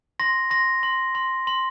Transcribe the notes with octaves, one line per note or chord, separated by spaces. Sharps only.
C6 A#6
C6 A#6
C6
C6
C6